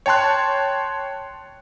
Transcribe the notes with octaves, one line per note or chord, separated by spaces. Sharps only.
C#5 G5 A5 C6 F#6